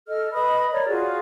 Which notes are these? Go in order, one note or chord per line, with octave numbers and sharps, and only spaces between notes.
A4 D#5 F6
B4 D#5 B5 D#6
A#4 C#5 D5
F4 F#4 G#4